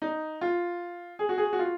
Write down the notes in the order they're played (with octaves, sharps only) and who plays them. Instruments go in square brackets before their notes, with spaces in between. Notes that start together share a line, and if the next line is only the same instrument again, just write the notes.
[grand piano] D#4
F4
G#4
F#4
G#4
F#4
F4